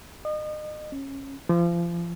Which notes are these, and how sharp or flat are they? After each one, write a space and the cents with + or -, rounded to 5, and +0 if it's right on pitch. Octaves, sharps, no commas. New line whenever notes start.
D#5 -35
C#4 -20
F3 -30